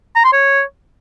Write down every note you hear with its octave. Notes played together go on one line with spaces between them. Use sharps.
A#5
C6
C#5